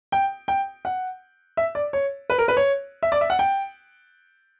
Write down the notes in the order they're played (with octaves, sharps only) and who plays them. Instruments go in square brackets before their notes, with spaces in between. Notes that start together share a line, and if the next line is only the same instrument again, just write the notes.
[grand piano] G5
G5
F#5
E5
D5
C#5
B4
A#4
B4
C#5
E5
D5
E5
F#5
G5